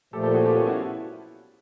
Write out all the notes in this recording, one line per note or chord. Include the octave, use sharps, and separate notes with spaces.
A#2 F3 A3 G4 A4
G4 A4
F#4 G#4
F4 G4
B3 C#4
E4 F#4